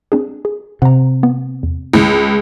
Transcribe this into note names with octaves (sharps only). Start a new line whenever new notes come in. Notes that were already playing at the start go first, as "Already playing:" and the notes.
C4 D4 G#4
G#4
C3 F#5 A#5
B3
E2
C#2 D#3 A#3 E4